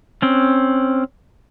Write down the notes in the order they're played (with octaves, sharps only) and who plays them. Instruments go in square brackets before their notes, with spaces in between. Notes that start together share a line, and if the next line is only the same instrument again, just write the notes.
[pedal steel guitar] C4 C#4